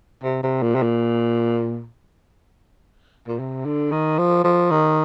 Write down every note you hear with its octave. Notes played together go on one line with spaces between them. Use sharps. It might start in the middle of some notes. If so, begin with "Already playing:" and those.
C3
C3
A#2
C3
A#2
A#2
C3
D3
D#3
F3
F3
D#3